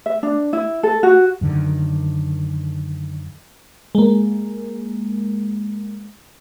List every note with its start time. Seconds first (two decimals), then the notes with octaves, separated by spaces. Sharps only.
0.06 E5
0.23 D4
0.53 E4
0.83 A4
1.03 F#4
1.41 F#2 D3 D#3
3.95 G#3 A#3